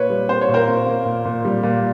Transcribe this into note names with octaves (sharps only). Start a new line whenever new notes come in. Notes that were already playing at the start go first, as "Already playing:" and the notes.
Already playing: A#2 B4 C#5
G3
A#3 C5
C#5
A#2
A#4 C5
A#3
A#3
A#2
A#2
G3
A#2